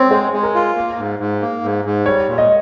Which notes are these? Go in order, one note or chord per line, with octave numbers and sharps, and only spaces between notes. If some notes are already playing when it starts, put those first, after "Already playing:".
Already playing: C4 C#5
G#3 C5
G#3
A#4
F4
A#3
G#2
G#2
A#3
G#2
G#2
G3 C#5
A#2
D#5